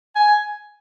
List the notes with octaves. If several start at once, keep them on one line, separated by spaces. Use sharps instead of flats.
G#5